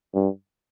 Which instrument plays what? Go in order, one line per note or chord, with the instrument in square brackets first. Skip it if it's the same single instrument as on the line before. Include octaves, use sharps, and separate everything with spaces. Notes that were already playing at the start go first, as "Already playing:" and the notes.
[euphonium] G2